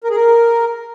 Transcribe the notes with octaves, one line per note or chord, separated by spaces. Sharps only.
A#4
G#4
A#4